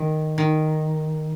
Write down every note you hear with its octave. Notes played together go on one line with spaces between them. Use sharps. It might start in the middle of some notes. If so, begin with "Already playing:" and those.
Already playing: D#3
D#3